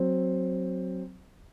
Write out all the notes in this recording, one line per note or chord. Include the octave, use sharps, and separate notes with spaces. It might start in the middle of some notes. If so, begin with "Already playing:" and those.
Already playing: F#3 C4